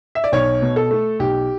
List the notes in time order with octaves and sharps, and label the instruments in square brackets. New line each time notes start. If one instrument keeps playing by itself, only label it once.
[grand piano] E5
D5
B1 C#5
B2
A4
A3
B1 G4